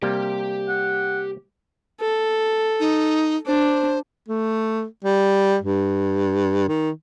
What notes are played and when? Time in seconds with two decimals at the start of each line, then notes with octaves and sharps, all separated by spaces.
0.02 C3 G3 A#3 G4 G5
0.68 F#5
2.00 A4
2.80 D#4
3.47 D4 C5
4.28 A3
5.04 G3
5.63 G2
6.68 D#3